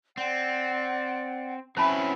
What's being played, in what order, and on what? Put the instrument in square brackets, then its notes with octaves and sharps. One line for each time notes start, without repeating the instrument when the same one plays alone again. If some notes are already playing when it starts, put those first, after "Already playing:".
[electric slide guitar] C4 [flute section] D5 F#5
[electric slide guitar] F#3 C4 B4 [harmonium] C#4 E4 [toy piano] C5 A5 B5